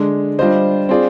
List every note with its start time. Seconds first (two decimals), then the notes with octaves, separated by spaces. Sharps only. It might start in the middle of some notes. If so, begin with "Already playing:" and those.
Already playing: D3 G#3 D4
0.39 G3 D4 F4 C5 D#5
0.89 C4 F4 G#4 D5